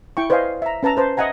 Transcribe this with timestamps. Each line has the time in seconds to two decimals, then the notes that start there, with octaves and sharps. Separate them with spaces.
0.17 E4 G5 C#6
0.30 B4 C5 D5 D#5 F5 G#5
0.62 E5 A#5
0.83 C#4 B4 A5 A#5 E6
0.97 B4 C5 A5
1.17 D#5 E5 F#5 G#5 A#5